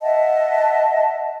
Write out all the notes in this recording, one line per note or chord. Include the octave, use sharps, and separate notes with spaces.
D#5 E5 F#5 A5